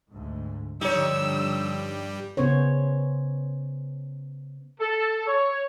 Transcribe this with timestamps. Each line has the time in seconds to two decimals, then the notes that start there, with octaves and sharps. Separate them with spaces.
0.11 D2 G#2
0.81 G2 D3 F3 G3 D#4 C#5 E6
2.37 C#3 B3 C#4 C5 C#5
4.80 A4
5.27 C#5